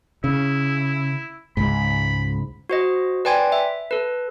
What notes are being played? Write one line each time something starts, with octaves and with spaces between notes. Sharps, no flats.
C#3 E4
C#2 G#2 B5
F#4 C5 D#5
B4 D5 G5 G#5 C6 G#6
E5
A4 B4